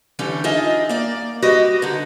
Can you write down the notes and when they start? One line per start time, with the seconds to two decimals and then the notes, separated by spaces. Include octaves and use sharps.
0.19 D3 E3 G3 C#4
0.44 D4 D#4 F4 G#4 D#5 E5
0.89 A#3 D5
1.42 G3 F#4 G4 B4 D#5
1.82 D3 D#4